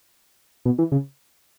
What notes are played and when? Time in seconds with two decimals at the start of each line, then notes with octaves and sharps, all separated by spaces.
0.65 B2
0.79 E3
0.92 C#3